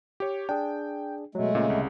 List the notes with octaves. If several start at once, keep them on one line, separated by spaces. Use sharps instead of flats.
G4 C#5
D4 G#4 G5
B2 F#3 G#3 A3
A#2 C#3
C2